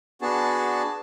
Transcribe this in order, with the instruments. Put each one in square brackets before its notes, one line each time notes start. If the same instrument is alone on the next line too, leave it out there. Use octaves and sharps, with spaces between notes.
[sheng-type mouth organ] B3 D4 F#4 G#4 A5